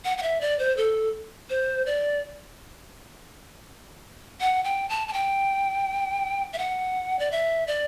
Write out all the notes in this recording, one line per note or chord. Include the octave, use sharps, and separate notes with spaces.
F#5
F#5
E5
D5
C5
A4
C5
D5
F#5
G5
A5
A5
G5
E5
F#5
D5
E5
D5